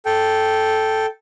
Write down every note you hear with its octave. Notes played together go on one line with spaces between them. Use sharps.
A4 G5